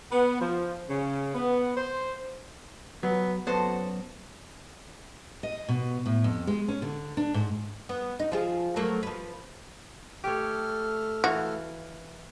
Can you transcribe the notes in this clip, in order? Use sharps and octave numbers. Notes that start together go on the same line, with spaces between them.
B3
F3
C#3
B3
C5
F#3 B3
F#2 B3 F#4 A4 C5
D#5
B2
A2
F2
G#3
C#4
D3
D4
G#2
B3
D#4
F3 F4 G#4
F#3 A3 A#3
F3 B4
A3 G4 A4 C#5 F6
E3 F#4 F5